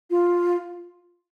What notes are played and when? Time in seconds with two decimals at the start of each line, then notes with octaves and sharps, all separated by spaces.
0.10 F4